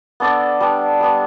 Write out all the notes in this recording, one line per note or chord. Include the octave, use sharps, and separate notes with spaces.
B3 D4 A4 D5
G3 B3 D4
G3 B3 D4